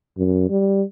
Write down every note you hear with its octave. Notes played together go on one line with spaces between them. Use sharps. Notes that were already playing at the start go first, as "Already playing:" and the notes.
F#2
G3